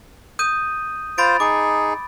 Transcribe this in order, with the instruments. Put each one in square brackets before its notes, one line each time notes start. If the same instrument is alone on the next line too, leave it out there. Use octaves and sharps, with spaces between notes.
[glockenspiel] D#6 G6 D#7
[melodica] F4 C5 [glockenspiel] B5 A6 D7
[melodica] D#4 G#4 [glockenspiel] D6